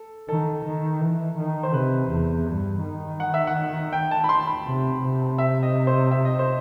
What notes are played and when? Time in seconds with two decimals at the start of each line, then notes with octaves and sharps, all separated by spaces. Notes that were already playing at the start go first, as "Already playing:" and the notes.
Already playing: A4
0.29 D#3 A4
0.65 D#3
1.01 E3
1.38 D#3
1.63 C5
1.74 C3 B4
2.11 E2
2.47 G2
2.84 D#3
3.20 F#5
3.34 E5
3.47 F#5
3.93 G5
4.11 A5
4.24 B5
4.29 C6
4.47 B5
4.66 C3
5.02 C3
5.38 E5
5.63 D#5
5.87 C5
6.11 E5
6.25 D#5
6.39 C5